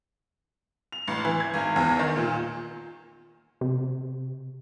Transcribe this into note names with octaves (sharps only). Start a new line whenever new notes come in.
F7
A1
E3
G#6
G#1
E2
D#3
A#2
C3